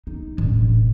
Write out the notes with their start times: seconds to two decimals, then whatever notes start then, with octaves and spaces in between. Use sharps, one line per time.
0.07 D#4
0.38 E1 A1